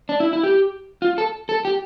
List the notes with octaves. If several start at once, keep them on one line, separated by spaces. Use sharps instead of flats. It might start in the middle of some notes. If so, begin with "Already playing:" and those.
D4
E4
E4
G4
F4
A4
A4
G4